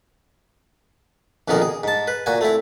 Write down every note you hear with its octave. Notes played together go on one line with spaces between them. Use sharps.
A#1 F2 B2 D#3 G#4 A#4
G#4
G#2 A5
B4
A#2 F#4 G#5
A3 C4 E4